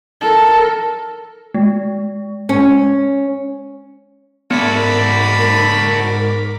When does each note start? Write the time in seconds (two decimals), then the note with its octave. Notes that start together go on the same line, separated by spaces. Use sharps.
0.21 A4 A#4
1.54 G#3
2.49 C#4
4.51 G#2 B3 F#4 A4 A#4 D5 B5 D6